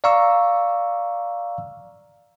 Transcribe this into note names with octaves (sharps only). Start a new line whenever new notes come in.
D5 F5 A#5 C#6 E6